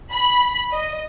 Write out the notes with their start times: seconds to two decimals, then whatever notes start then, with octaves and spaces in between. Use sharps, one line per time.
0.12 B5
0.72 D#5